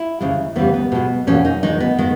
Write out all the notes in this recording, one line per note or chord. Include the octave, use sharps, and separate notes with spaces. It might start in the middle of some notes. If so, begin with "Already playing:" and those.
Already playing: E4
D#2 C#3 G#3
D#2 C#3 E3 G3 B3
B3
B2 G#3
E2 B2 A#3 C#4
D#4
E2 D#3 G#3 D#4
B3
D#3 G#3